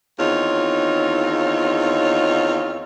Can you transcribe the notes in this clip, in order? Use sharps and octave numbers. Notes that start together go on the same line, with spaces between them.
E2 D#3 C4 D#4 F4 C#5